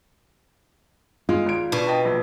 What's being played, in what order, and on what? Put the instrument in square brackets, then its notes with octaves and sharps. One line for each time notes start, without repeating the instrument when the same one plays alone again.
[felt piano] G#3 [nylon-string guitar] F4
[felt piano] G#1 D7
[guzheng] B2 [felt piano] D4
[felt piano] D#5 G5 A5
A#1